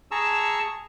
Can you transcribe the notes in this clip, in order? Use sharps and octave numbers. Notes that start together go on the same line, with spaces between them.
G#4 A5 A#5 C#6 E6